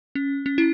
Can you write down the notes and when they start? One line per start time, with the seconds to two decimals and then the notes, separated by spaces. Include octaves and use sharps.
0.15 C#4
0.46 C#4
0.58 E4